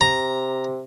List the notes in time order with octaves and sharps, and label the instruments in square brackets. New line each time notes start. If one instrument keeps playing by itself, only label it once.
[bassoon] C3 [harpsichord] A#5